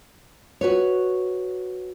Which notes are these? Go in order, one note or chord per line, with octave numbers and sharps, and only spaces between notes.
F#4 B4 C#5